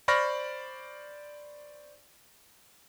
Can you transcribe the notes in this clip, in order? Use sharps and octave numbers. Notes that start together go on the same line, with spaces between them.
C5 D5 B5 C#6 F6 A#6